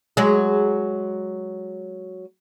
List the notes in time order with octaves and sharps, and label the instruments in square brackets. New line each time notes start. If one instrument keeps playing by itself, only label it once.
[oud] F#3 G#3